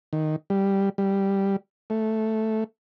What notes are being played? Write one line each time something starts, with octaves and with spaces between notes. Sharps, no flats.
D#3
G3
G3
A3